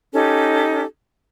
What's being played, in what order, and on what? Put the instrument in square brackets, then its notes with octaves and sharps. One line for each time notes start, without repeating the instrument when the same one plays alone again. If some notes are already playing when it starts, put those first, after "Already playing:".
[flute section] C#4 D#4 G4 A4